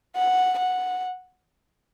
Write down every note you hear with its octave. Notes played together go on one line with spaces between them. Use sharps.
F#5
F#5